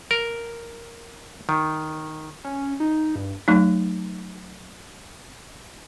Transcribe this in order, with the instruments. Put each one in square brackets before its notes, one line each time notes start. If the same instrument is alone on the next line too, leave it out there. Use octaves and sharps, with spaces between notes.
[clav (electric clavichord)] A#4
D#3
[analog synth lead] C#4
D#4
G2
[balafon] F#3 A3 D#4